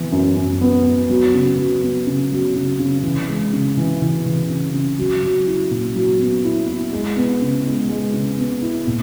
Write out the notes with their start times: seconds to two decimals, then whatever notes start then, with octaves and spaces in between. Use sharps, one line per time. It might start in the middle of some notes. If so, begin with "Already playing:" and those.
Already playing: E3 B3
0.12 F#2
0.37 F#2
0.61 B3
0.85 B3
1.09 F#3
1.34 C#3
1.58 F#3
1.82 B3
2.07 C#3
2.31 F#3
2.56 C#3
2.79 C#3
3.03 E3
3.29 G#3
3.53 C#3
3.77 E3
4.02 E3
4.26 E3
4.49 C#3
4.74 C#3
4.98 F#3
5.23 F#3
5.47 E4
5.71 A#2
5.95 F#3
6.20 B3
6.44 E4
6.68 E4
6.93 G#3
7.16 B3
7.42 C#3
7.66 G#3
7.89 G#3
8.13 C#3
8.38 B3
8.62 E4
8.87 A#2